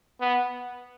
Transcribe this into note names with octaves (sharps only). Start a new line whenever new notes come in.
B3